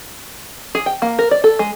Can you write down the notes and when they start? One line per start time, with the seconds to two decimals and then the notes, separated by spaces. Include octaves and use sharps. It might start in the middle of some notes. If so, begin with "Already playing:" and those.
0.75 G#4
0.86 G5
1.02 A#3
1.19 A#4
1.31 D5
1.44 A4
1.59 G#3